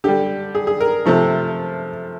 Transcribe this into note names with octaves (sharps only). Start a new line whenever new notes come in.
D3 G3 G4
G#4
G#4
A#4
C3 F3 A3